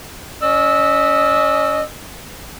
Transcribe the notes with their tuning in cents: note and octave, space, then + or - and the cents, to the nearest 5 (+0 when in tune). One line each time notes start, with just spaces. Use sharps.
C#4 +20 D#5 -25 E6 -15